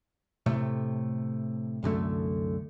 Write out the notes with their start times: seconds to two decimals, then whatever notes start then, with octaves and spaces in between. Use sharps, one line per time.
0.46 A2 C3 A3
1.83 C2 F#2 D3 A3